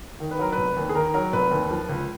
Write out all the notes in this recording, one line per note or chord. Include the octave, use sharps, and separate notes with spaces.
D#3
B4
F#3 A#4
B4
F1
D#2
G#4
D#3 A#4
F#3 A#4
F1 B4
D#2
F3
C#2